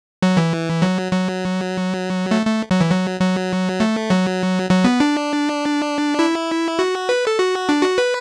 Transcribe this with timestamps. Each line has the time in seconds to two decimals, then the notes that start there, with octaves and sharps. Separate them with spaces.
0.22 F#3
0.37 E3
0.82 F#3
1.12 F#3
2.31 A3
2.46 A3
2.71 F#3
2.81 E3
2.91 F#3
3.20 F#3
3.80 A3
4.10 F#3
4.70 F#3
4.84 B3
5.00 D4
6.19 E4
6.79 F#4
7.09 B4
7.27 A4
7.39 F#4
7.69 D4
7.83 F#4
7.98 B4